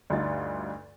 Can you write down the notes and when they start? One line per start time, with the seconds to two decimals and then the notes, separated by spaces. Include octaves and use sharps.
0.10 D2 G2 D#4 F4 A6